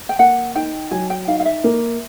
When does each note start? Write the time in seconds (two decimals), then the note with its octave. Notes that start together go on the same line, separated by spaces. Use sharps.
0.09 G5
0.19 A#3 F#5
0.55 D#4 G5
0.91 F#3 G#5
1.10 G5
1.27 D#4 F5
1.40 F5
1.45 E5
1.64 A#3